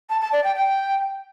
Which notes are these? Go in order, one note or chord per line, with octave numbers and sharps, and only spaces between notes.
A5
A5
D5
G5
G5